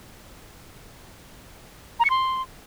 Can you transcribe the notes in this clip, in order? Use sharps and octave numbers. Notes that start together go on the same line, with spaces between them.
A#5
C#7
C6